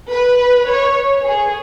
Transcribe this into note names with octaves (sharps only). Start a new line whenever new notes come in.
B4
C#5
G#4